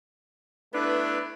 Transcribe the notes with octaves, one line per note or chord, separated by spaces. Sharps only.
A3 B3 D4 E4 B4